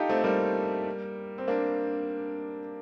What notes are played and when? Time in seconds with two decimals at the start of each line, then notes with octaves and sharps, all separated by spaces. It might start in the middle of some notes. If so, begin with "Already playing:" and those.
Already playing: D#4 F4 G4 A4
0.10 A3 C4
0.24 G3 A#3
1.38 C4
1.48 A#3 D4